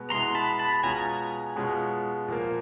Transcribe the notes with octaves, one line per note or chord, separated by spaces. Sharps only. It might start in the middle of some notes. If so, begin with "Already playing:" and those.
Already playing: B2 G#3 B3
B2 G#3 B3 E4 A#5 C6
A5 B5
A5 B5
B2 G#3 C#4 F4 G#5 A#5
B2 G#3 C#4 F4
A#2 F3 A#3